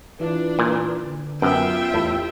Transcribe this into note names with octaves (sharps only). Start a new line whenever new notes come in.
E3 D4 E4 F4 B4
A#2
D3
F#2 B3 C#4 F4 B4 E5 G5
E2 A2 G4